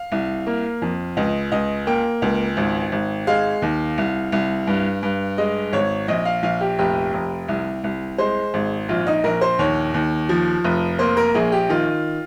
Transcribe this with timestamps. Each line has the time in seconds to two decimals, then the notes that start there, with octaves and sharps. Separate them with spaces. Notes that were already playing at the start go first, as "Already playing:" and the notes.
Already playing: F5
0.12 C2
0.47 A#3
0.82 F2
1.17 C#2 D#5
1.52 C#2 D#5
1.87 A#3 G5
2.22 C#2
2.57 G#1
2.92 G#1
3.27 G#3 F5
3.62 D#2
3.98 C2
4.32 C2
4.67 G2
5.03 G2
5.38 G#3 D#5
5.73 G#1 C#5
6.08 A#1 D#5
6.25 F5
6.43 A#1 F5
6.61 G4
6.78 F1 G4
7.14 F1
7.48 C2
7.84 C2
8.18 G#3 C5
8.54 G#1
8.89 A#1 F4
9.07 D#4
9.24 A#1 A#4
9.41 C5
9.59 D#2 C#5
9.94 D#2
10.29 F3
10.64 F1
10.99 A#3 C5
11.17 A#4
11.35 A#1 G#4
11.52 G4
11.69 D#3 F4